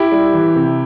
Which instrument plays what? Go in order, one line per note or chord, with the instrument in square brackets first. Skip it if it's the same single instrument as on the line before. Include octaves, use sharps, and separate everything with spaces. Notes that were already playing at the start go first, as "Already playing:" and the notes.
Already playing: [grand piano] E4 G4
G3
E3
C3